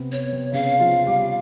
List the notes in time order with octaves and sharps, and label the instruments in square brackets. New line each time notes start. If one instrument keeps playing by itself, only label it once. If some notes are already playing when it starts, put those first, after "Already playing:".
Already playing: [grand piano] C3 B3 C4
[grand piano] B3 [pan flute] C#5
[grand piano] C3 C4
[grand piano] C#3 C#4 [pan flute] F5
[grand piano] F3 F4
G3 G4